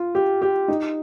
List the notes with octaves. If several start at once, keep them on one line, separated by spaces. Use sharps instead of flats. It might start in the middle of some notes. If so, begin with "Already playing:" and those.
Already playing: F4
G4
G4
D#4